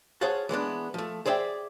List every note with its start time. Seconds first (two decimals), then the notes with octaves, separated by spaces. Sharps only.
0.21 G#4 C5 C#5 F5 F#5 A5
0.49 E3 G#3 B3 D4
0.94 F3 A3
1.26 G#4 C5 D5 E5 G5